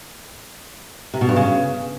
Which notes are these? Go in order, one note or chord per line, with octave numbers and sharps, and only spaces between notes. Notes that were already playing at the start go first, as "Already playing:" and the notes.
C3
B2
G2
C#3